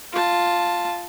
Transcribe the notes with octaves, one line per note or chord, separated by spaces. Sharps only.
F4 A5